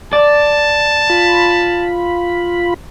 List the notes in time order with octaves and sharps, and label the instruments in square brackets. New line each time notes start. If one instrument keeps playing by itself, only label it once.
[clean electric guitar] D5 [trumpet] A5
[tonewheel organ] F4 B5